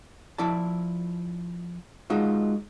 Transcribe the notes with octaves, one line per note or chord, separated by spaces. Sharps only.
F3 E4 D5 A5
G#3 D#4 F4 F#4